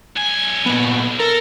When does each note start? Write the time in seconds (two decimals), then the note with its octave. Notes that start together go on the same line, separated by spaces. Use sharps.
0.16 B1 G#5
0.66 A#2 B3
1.20 A4 A#4